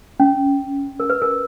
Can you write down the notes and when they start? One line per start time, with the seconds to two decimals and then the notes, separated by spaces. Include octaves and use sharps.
0.20 C#4
1.00 A#4
1.10 B4
1.22 A#4